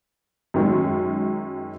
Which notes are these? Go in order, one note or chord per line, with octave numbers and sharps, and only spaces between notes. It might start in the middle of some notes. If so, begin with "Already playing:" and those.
F#2 D#3 G#3